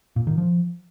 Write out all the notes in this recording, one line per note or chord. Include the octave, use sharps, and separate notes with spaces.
A#2
D#3
F3